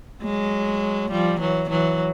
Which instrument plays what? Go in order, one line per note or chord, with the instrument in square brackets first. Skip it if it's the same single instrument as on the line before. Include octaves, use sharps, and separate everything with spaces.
[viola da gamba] F#3 G#3
F3 G3
E3 F#3
E3 F#3